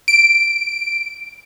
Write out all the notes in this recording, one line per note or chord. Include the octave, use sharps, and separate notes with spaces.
D7